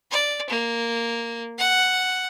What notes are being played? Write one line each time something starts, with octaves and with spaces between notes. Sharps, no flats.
D5
A#3
F#5